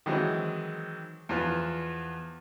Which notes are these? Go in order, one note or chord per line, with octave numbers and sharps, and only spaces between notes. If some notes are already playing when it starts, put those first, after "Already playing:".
D#3 E3 F#3 G#3 C4
E2 F3 F4 B4